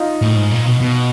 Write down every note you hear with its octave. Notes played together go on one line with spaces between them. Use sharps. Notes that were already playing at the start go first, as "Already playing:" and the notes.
Already playing: D#4 F4
A2
G#2
A#2
B2
B2